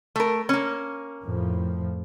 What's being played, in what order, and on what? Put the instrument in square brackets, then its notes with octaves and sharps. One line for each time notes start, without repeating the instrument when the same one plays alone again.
[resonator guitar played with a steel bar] A3 A#4
A#3 C#4
[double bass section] F2 A2 F3